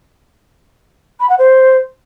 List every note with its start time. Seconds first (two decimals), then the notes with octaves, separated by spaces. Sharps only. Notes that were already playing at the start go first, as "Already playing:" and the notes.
1.20 B5
1.29 F#5
1.39 C5